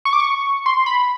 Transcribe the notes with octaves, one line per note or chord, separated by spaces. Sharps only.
C#6
D6
C#6
C6
B5